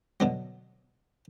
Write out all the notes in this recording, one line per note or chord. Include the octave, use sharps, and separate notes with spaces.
B2 D3 F#3